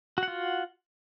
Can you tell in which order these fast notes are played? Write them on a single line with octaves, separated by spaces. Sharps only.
F#4 F#5 F4